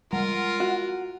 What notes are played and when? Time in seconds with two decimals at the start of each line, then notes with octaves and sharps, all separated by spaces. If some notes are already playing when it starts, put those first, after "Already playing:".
0.13 G3 G#3 F4 A#4 F#5
0.60 F#4